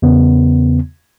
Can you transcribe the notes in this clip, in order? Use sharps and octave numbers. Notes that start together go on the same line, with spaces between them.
E2 C#3 B3